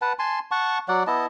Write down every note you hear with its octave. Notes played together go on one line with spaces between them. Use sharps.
B4 F#5 A5
G#5 A5 C6
F#5 A5 C#6
F#3 D5 F#5
B3 E4 D#5 A5